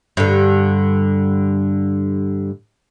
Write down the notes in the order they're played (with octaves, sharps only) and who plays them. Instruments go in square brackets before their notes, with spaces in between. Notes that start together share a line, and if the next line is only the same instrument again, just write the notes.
[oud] G2 D3